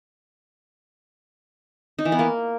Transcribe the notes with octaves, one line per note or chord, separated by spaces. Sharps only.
D#4
E3
B3
A#3